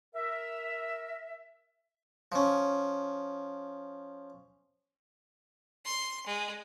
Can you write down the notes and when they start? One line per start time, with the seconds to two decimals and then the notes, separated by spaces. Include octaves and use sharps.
0.14 A#4 E5
2.32 F3 C#4
5.85 C6
6.26 G#3